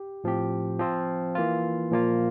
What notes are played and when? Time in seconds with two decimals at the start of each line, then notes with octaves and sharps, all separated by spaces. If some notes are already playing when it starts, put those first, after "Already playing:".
Already playing: G4
0.24 A2 F3 C4 G4
0.79 F3 C4 F4
1.35 E3 A#3 F4
1.91 A#2 F3 A#3 F4